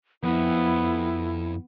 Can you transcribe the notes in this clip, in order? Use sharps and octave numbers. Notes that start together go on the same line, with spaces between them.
F2 B3 E4